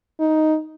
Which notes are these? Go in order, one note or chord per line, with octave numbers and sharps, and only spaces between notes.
D#4